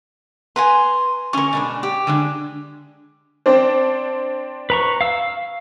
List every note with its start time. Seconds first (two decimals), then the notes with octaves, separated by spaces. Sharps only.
0.56 B4 G#5 A#5 C6
1.33 D3 C#4 A#4 G#5 C#6
1.53 B2 G#3 D4
1.83 G4
2.07 D3 G#3 D4
3.46 C4 D4 C5
4.70 B4 A#5 C#6
5.01 F5 E6